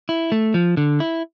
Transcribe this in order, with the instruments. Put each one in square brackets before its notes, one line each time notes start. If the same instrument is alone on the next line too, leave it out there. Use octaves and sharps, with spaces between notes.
[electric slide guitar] E4
A3
F3
D3
E4